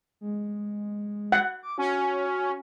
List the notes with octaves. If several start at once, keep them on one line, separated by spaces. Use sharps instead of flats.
G#3
F#5
D6
C#4 F#4